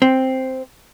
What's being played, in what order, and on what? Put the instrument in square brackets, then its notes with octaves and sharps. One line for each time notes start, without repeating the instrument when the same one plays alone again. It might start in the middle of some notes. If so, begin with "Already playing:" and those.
[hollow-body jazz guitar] C4